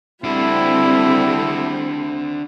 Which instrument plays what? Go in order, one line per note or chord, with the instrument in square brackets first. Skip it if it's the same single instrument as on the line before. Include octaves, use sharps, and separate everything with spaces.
[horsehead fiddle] G3 A4 [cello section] C4 [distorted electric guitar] D4 F#4 [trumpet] E4